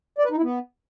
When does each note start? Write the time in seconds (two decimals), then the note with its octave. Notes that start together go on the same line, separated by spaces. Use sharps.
0.19 D5
0.25 B4
0.31 D#4
0.37 E4
0.43 B3